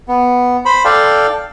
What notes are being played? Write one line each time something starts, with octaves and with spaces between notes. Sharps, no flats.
B3
C5 B5
A4 D5 F5 G5